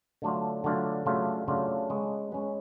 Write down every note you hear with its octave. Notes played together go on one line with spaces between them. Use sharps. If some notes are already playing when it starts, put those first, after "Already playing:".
D3 F#3 A3 D4 F4
D3 F#3 A3 D4 F4
C#3 F#3 A3 D4 F4
C#3 F#3 A3 D4 F4
G#3 C#4 G#4 B4
G#3 C#4 G#4 B4